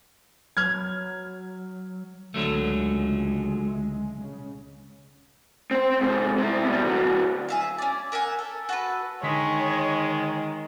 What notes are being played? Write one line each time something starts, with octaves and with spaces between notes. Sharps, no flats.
F#3 F6 G#6
C#2 D3 F#3 G#3 A3
C#3
C4 C5
G#2 C3
C3 E4
B2 G3
D3 F#3
G#4 E5 F5
C#4 D5
A#4 E5 F#5 G#5
A4
F#4 A4 B4
D3 D#3 G#3 C#5 B6